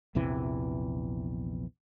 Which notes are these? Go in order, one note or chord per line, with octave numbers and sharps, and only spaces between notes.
A#1 E2 C3 E3